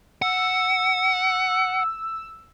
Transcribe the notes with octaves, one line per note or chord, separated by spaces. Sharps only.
F#5 E6